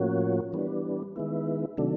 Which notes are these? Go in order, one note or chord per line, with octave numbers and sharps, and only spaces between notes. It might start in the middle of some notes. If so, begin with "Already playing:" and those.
Already playing: A2 F3 A#3 C#4 F#4
E3 G3 B3 D4
D#3 G#3 B3 E4
C3 D#3 F#3 A3 D4